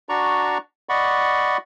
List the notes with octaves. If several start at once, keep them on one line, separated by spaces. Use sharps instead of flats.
D4 F#4 D5 A#5 C#6
D5 D#5 F#5 B5 C#6